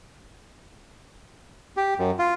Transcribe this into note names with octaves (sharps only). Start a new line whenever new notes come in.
G4
F#2
F4